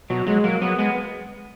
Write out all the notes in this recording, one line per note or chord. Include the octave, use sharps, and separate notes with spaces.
B2 F#3
F#3 G#3
F#3 A#3
F#3 B3
G#3 B3